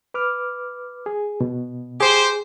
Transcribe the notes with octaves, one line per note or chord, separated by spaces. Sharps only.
B4 D6 F6
G#4
B2
G4 G#4 C5